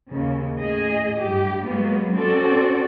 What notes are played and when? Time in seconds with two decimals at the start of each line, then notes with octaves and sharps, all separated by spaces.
0.10 D#2 C#3
0.61 A2 G#4 D#5
1.20 G2 G4
1.65 F#3 G#3 A#3 B3
2.15 C4 C#4 F#4 A4 D5